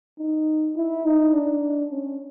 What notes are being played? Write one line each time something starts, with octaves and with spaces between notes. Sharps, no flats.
D#4
E4
D#4
D4
C#4